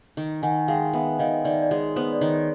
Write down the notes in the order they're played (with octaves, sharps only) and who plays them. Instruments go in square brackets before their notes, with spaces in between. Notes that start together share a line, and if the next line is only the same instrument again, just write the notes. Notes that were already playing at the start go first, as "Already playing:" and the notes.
[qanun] D#3
[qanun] D#3 [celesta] F#5 G#5
[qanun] G#3 [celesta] F5 G5
[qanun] B3 [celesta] E5 F#5
[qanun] D#3 [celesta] D#5 F5
[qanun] D#3 [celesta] D5 E5
[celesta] D5
[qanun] G#3 [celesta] C#5
[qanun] B3 [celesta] C5
[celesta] D5
[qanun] D#3 [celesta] C#5